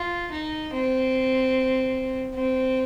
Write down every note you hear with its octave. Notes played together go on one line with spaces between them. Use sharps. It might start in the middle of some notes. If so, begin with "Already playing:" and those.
Already playing: F4
D#4
C4
C4